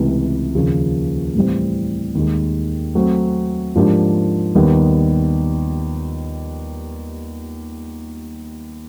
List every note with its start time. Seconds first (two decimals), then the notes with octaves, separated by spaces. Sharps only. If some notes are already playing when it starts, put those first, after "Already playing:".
Already playing: C#2 C3 E3 A3
0.55 D#2 C#3 F3 A#3
1.35 A2 E3 G3 C4
2.15 D#2 D#3 G#3
2.95 F#3 A3 C4
3.75 G#2 F3 A#3 D4 G4
4.55 D#2 D#3 G3 B3